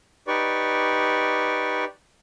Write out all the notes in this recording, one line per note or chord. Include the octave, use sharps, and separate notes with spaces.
D#4 G4 B4 D5 C#6